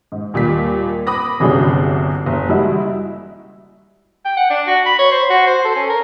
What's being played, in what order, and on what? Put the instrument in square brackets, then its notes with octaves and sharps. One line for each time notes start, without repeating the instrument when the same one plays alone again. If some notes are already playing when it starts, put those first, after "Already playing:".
[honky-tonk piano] G#2
D#2 A#2 G3 B6
B5 D6 D#6 A#6
G1 C2 F#3 C#4 D4 G#4
F#1
G3 G#3 E4 F#4
[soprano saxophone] G5
F#5
D4
F#4
B5
C#5
C5
F#4
C5
A4
C#4
A#4